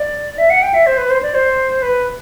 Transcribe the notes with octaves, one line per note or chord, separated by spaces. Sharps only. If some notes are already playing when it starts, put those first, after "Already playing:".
Already playing: D5
E5
F#5
G5
E5
C5
B4
C5
D5
C5
B4